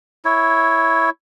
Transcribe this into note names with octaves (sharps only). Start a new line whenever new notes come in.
E4 C#5